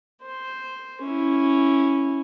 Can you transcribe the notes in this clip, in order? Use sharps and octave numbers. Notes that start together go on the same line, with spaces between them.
C5
C#4 E4